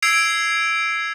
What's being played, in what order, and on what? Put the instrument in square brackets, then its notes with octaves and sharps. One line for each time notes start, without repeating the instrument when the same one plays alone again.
[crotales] E6 G#6 C7 D7 F7